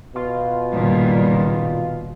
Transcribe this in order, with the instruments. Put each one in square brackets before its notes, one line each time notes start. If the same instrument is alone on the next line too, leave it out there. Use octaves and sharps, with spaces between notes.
[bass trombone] B2 [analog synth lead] F4
[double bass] F#1 D#3 [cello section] A#2 G3